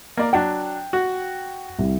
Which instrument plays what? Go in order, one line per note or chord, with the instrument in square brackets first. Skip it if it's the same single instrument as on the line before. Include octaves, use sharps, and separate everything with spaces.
[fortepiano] A#3 D5 A#5
[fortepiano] F#3 D4 [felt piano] G5
[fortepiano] F#4
[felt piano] C2